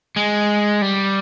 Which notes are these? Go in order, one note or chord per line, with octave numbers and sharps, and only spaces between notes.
G#3
G3